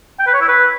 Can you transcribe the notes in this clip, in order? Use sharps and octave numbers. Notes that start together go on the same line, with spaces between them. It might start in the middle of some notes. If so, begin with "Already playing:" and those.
G5
B4
C#5
E4
B4